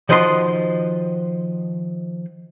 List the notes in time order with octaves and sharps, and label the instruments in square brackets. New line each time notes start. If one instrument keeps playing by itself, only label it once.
[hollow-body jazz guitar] D#3 F3 F#4 D#5 F#5 C6